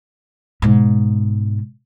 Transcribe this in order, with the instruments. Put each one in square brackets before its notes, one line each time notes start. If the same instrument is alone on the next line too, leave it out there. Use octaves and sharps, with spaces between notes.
[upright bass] G#2 B2